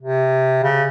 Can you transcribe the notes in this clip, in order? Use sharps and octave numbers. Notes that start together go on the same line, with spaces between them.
C3
C#3